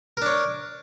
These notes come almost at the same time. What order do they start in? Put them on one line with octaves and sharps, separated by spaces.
A#4 D4 C#5